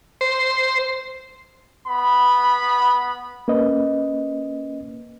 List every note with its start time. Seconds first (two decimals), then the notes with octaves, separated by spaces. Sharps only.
0.21 C5
1.87 B3 B5
3.48 A#3 C#4 B4 D#5